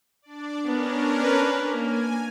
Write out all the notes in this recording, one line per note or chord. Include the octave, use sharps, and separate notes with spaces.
D4 D5
B3 C#4 D4 A#4
B4
A#3 G#5